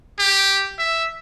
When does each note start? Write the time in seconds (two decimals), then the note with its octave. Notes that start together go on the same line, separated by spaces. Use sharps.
0.19 G4
0.79 E5